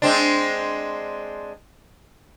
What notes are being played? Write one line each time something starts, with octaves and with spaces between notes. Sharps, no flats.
G#3 C4 D4